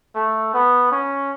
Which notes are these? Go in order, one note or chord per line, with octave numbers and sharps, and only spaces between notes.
A3
B3
C#4